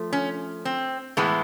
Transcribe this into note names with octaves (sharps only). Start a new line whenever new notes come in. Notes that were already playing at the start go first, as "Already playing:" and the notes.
Already playing: F3 A3
C#4
C4
A2 E3 G#3 B3